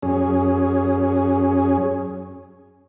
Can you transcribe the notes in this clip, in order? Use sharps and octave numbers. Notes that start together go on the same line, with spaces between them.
F#2 C#4 G#4